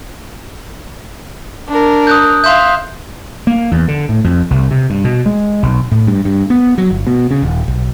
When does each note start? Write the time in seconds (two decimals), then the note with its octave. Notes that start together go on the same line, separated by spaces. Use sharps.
1.68 D4 A#4
2.07 D#6 F#6 G6
2.44 E5 F5 C6 G6
3.47 A#3
3.71 E2
3.88 D3
4.09 A2
4.24 F2
4.50 C2
4.71 C3
4.90 G2
5.04 B2
5.26 G#3
5.63 B1
5.92 A2
6.07 G2
6.25 G2
6.50 B3
6.78 F#3
6.91 G1
7.07 B2
7.31 C#3
7.42 D#1
7.68 B1